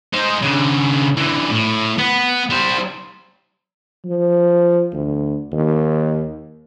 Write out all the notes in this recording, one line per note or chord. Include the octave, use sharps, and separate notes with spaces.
D#4 C5
C#3 D4
D3 E3
A2
B3
G3 C5
F3
D2
D#2